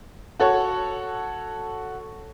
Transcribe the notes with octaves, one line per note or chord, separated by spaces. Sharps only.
F#4 A4 C#5